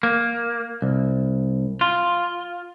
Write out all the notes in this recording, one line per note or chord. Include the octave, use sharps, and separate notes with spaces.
A#3
C2
F4